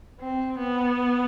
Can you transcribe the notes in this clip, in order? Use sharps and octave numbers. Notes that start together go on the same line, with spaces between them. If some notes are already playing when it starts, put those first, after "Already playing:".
C4
B3